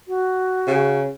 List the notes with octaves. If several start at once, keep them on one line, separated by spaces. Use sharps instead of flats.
F#4
C#3